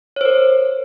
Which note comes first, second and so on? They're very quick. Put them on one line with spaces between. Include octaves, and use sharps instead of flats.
C#5 C5 A#4